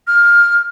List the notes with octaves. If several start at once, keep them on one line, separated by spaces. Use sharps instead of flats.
F6